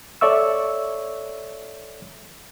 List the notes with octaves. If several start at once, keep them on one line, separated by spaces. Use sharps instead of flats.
A4 C#5 D5 E5 C#6 E6